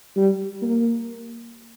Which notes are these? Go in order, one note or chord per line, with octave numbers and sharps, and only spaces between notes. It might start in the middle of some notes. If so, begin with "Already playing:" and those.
G3
A#3